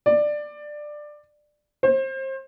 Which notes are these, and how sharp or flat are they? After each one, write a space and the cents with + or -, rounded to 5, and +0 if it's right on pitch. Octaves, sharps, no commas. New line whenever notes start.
D5 +15
C5 +30